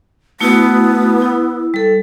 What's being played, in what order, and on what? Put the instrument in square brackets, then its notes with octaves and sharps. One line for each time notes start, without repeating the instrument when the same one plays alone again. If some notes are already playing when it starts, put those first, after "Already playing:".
[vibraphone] A3 E4 F#4 [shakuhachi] B3
[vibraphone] E4
G3 A4